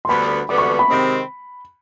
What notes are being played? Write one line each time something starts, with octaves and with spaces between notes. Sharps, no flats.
C6
D2 D3 G3 B3 B5
D2 D3 G3 B3 D6
C#6
B5
C3 D#3 G#3 C4